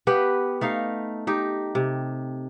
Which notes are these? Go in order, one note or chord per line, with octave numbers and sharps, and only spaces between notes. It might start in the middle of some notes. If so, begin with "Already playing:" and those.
B3 G4 B4
A3 D#4 F5
D#4 G4
C3